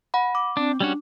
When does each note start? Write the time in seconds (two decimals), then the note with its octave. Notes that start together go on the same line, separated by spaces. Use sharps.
0.14 F#5 B5
0.35 D6
0.57 C4 D4
0.80 G3 C#4 D4 F#4